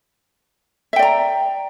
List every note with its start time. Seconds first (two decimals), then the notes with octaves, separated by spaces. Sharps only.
0.93 E5
0.96 G5
0.99 D5
1.02 A#5